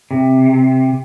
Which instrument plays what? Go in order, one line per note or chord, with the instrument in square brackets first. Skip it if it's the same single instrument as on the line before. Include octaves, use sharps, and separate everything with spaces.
[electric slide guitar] C3